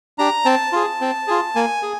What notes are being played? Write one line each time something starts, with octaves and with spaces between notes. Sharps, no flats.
D4 G4 A#5
C4 A5
F4 G#4
C4
F4 G#4
A#3 G#5
G#4